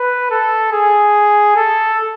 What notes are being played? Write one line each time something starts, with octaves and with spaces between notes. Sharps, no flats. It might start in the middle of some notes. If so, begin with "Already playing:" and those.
Already playing: B4
A4
G#4
A4